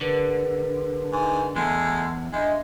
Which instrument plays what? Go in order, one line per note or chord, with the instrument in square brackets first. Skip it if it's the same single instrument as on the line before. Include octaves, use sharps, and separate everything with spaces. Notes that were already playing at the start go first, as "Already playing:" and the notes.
[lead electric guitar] D3 [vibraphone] G#4 A#4 B4
[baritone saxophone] G#2 [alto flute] G#5
[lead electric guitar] E2 [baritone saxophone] G#3 [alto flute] A3
[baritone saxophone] G#3 [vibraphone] D4 E5 [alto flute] D#5